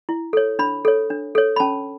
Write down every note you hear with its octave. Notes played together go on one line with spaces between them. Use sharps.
E4
A4 C#5
D4 B5
A4 C#5
D4
A4 C#5
B5
C#4 A5